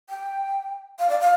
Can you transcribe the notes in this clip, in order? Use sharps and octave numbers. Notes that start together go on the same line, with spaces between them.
G5
F5
D5
F5